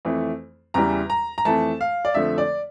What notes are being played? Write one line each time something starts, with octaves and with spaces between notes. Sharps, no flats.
F2 E3 A3
E2 C#3 E3 G3 A#5
A#5
A#5
F2 E3 A3 A5
F5
D5
F2 D3 F3 A3 E5
D5